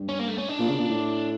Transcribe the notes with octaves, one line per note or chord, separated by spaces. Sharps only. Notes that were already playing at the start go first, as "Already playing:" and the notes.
Already playing: G2
C#4
A#3
A3
C#4
D4
A#2
C#3
A#2
A2